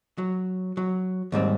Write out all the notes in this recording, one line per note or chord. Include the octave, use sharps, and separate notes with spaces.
F#3
F#3
D#2 G#2 G3 C4